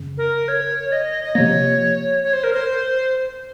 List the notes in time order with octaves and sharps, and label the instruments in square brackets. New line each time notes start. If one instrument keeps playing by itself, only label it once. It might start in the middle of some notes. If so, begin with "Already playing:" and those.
Already playing: [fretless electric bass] F#2 C#3
[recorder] A#4
C#5
D#5
D#5
[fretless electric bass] C3 F3 A#3 [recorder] C#5
[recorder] C#5
C5
A#4
C5